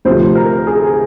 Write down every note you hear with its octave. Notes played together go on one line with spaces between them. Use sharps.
D2 C3 F3 A3 C5
A#4
G#4